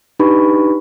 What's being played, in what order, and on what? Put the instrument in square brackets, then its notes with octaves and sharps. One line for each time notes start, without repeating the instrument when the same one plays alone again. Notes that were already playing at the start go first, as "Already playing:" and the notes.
[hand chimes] D4 D#4 G4 B4 B5 C#6